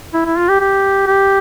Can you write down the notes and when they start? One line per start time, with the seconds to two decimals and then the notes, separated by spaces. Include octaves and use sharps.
0.14 E4
0.25 E4
0.37 F4
0.49 G4
0.60 G4
1.07 G4